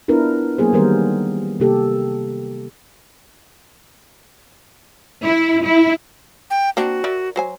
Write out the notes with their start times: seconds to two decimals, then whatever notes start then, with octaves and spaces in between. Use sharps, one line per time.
0.08 B3 D4 E4 F4 A#4 B4
0.58 F#3 A#3 B3 G#4 C5
0.73 D#3 E3 G3 B3 A#4 C5
1.60 C3 A#3 G4 A4
5.24 E4
5.63 E4
6.50 G5
6.77 A#3 C4 D4 F#4
7.04 A#4 D5 E5
7.36 F#3 C5 G#5